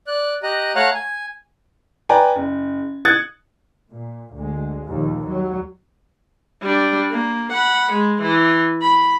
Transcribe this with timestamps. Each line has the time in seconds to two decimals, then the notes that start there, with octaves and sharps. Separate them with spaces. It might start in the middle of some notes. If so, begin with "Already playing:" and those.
0.07 D5 F#6
0.43 G4 D#5 A#5 D#6 F#6
0.75 A3 C#5 F5 F#5 A#5 F#6
0.94 G#5
2.09 B4 D5 G5 G#5 A#5
2.36 F#1
3.05 D#6 F#6 G#6 A6 C#7
3.91 A#2
4.35 D2 G#3
4.85 D#2 A#2 F3
5.26 F#3 G3
6.63 G3 D4
7.11 A#3
7.53 F#5 B5
7.92 G#3
8.22 E3
8.82 B5